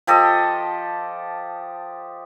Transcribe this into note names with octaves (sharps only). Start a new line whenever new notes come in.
F3 G4 A4 D#5